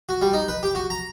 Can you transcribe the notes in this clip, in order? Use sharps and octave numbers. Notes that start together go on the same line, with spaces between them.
F#4
G3
D#4
B4
G4
F#4
A#5